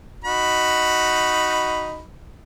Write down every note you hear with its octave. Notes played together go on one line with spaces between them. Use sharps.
D#4 F#4 B5